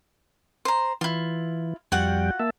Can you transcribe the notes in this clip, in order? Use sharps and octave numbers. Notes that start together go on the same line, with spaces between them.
C5 A#5
E3 E4 F4
F2 G3 F4 F#4 F#5 G5
A#3 E5 A5